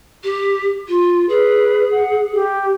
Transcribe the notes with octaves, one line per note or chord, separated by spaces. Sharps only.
G4
F4
G#4 B4
F#5
G4